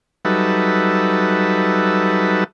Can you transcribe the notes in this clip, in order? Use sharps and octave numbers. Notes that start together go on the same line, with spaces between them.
F#3 G3 D#4 A4 B4 E5